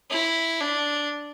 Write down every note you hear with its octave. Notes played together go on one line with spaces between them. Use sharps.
E4
D4